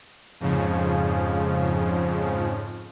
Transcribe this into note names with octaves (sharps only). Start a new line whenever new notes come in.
F2 G#2 C#3 F3